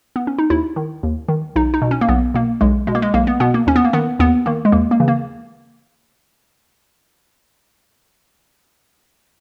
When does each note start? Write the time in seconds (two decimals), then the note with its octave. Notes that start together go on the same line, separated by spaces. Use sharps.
0.16 B3
0.27 C#4
0.38 D#4
0.50 D#2 E4
0.76 D#3
1.03 D#2
1.29 D#3
1.56 B1 D#4
1.74 D#4
1.82 B2
1.91 C#4
2.01 A#3
2.09 B1 B3
2.34 B2 A#3
2.61 B1 G#3
2.87 B2 G#3
2.95 A#3
3.02 G#3
3.14 B1 A#3
3.27 B3
3.40 B2 B3
3.54 A#3
3.67 D#2 C#4
3.76 B3
3.85 A#3
3.93 D#3 B3
4.19 D#2 B3
4.46 D#3 A#3
4.65 G#3
4.72 D#2 A#3
4.91 A#3
5.00 C#3 E3
5.08 A#3